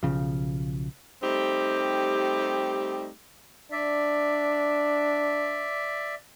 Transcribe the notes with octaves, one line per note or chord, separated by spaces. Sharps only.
B1 C#3 F3
G3 A3 C4 D#4 G4
D4 D5 E5